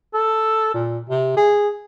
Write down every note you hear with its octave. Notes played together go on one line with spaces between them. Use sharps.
A4
A#2
C3
G#4